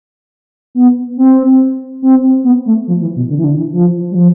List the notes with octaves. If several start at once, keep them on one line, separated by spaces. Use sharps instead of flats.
B3
C4
C4
B3
A3
F3
E3
B2
D3
E3
D3
E3
F3
G3
F3